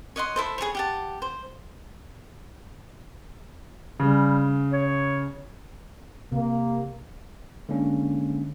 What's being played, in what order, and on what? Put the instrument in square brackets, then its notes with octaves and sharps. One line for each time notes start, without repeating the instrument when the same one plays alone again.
[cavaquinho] C#5 D#5 F#5 C6
E4 A4 C5
G#4 A4 B4 C#5
G4 F#5 A5
C5
[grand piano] C#3 [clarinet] G3
[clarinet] C#5
[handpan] C3 [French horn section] A#3
[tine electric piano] D3 G#3 A#3 C#4 D4